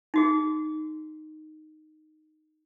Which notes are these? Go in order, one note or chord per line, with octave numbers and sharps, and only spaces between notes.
D#4 F#4 G#4